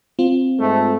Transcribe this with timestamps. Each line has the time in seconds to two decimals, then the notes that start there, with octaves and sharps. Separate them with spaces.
0.19 C4 F4
0.59 G#2 A3